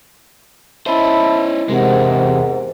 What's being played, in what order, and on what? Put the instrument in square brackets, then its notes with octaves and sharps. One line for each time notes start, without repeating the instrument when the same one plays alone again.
[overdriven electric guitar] C#4 C5 [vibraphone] E4 D#5 [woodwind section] E5 A5 B5
[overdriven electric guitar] E2 G#3 [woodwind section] G#2 [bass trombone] C3 [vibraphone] A#4 F#5